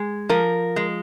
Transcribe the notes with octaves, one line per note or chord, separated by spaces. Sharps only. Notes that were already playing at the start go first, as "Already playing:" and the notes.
Already playing: G#3
F3 A#4
G#3